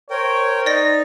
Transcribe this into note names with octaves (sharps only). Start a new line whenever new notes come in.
A#4 C5 C#5 G5
D#4 D5 A#6